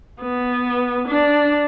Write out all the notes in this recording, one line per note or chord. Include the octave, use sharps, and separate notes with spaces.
B3
D4